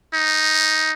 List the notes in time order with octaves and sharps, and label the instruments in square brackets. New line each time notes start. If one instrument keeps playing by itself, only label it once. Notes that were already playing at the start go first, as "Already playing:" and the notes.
[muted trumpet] D#4